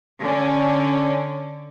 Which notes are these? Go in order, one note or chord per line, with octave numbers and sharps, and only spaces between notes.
D3 C#4